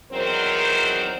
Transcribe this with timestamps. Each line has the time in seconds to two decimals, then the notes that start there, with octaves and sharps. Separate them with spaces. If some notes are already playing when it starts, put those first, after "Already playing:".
0.12 E2 D#3 F#3 C4 A#4 C5